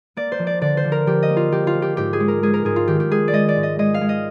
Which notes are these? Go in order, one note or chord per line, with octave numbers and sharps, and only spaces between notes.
A#3 D5
C5
F3
D5
D3 D5
C5
F3
A#4
F3 G4
D#5
A#3
F4
F3 G4
F4
F3
G4
G#2 G4
G#4
G#3
A#4
G#3 G#4
A#4
G#2 G#4
F4
D#3 G4
G4
G#3 G#4
D5
G#3 D#5
D5
G#2
D#5
G#3 D#5
F5
G#3
D#5